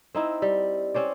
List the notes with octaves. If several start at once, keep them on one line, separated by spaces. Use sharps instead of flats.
C4 D#4 E4
G3
C4 C#4 C5 D5